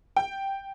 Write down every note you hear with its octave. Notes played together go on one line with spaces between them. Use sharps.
G5